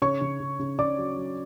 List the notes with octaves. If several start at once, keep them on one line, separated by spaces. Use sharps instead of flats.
C#3 C#5 C#6
C#3
C#3
C#3
C#3 D5 D6
F#3
F#3